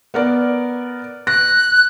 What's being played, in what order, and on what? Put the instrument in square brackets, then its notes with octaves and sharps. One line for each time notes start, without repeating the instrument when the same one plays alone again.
[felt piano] B3 A#4 D5
[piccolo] F#6 [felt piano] A#6